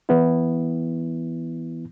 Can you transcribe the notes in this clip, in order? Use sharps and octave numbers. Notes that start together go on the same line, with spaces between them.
E3 B3 E4